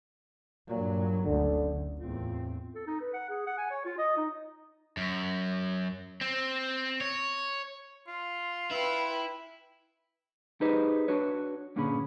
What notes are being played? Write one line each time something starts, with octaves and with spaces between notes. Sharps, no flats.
G2 A#2 F#3
F#1 D2 D3
E2 A2 C4 F4
A4
D#4
B4
F#5
G#4
F#5
G#5
C#5
F4
D#5
D#4
F#2
C4
C#5
F4 C6
E4 B4 G5
D#4 G4 G#4 B4 C5 D#5
D4 F#4 B4 C#5
G2 A#2 D3 C#4 G#4 B5